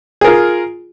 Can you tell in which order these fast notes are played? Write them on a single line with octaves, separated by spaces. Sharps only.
G#4 A#4 F4